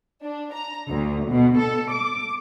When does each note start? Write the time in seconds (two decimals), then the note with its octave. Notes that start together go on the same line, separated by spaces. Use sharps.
0.22 D4
0.55 A#5
0.89 D2
1.30 B2
1.60 A4
1.91 D6